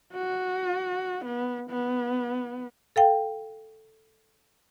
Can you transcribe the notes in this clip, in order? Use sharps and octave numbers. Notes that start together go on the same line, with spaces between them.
F#4
B3
B3
A4 F5 G5